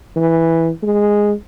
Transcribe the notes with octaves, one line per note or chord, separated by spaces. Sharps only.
E3
G#3